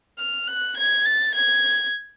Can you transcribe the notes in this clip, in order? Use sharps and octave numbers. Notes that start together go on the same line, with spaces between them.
F6
F#6
G#6
A6
G#6